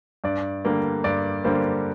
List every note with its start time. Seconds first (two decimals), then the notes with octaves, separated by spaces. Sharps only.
0.24 G2 D5
0.65 D3 G3 A#3
1.04 G2 D5
1.44 D3 G3 A#3 C5